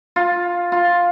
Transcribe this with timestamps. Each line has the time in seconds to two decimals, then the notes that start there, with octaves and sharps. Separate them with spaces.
0.16 F4
0.72 F4